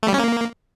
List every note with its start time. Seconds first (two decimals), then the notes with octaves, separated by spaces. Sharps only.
0.03 A3
0.08 G3
0.14 C#4
0.20 A#3